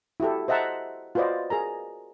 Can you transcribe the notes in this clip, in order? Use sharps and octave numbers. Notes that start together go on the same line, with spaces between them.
E4 F#4 G4 A4
C5 D#5 E5 F#5 A5 A#5
F4 F#4 B4 C5 D5 D#5
G#4 A#4 A#5